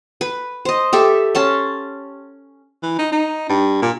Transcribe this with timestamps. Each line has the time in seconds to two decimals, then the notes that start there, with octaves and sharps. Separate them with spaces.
0.21 B4
0.65 C5 D#5
0.93 G4 A4 E5
1.35 C#4 A5 C6
2.83 E3
2.99 D#4
3.12 D#4
3.49 G2
3.82 A#2